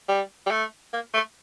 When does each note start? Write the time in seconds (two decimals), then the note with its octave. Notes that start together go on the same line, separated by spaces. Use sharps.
0.09 G3
0.46 G3
0.51 A3
0.93 A#3
1.14 A3